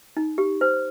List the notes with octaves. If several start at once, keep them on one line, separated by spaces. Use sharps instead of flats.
D#4
G4
C5